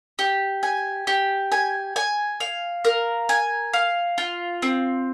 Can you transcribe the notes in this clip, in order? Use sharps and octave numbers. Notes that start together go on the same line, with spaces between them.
G4
G#5
G4
G#5
G#5
F5
A#4
G#5
F5
F4
C4